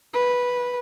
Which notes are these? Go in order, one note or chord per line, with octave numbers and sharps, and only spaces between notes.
B4